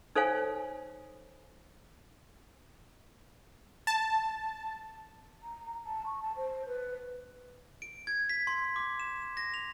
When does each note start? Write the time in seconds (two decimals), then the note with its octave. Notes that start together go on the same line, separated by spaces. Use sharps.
0.16 D#4 A4 C5 C#5 F5 G#5
3.87 A5
5.43 A#5
5.86 A5
6.06 C#6
6.22 A5
6.37 C5
6.67 B4
7.82 D7
8.07 G#6
8.29 B6
8.47 C6
8.76 D6
9.00 E7
9.37 A#6
9.54 F7